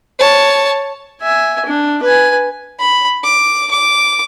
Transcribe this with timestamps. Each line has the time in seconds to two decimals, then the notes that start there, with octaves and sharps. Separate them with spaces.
0.19 C#5 A5
1.21 E5 G#5
1.65 D4
2.02 B4 G#5
2.79 B5
3.24 D6
3.71 D6